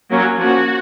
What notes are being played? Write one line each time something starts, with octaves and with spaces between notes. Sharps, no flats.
F#3 A#3 C#4
F3 A#3 C#4 F#4